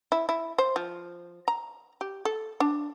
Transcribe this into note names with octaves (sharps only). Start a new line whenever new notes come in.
E4
E4
C5
F3
A#5
G4
A4
D4